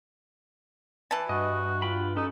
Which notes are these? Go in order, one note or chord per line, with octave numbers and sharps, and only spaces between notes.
E3 A5
G2 F#4 D#5
F4 G5 B5
C#4 D#4 F#4 A4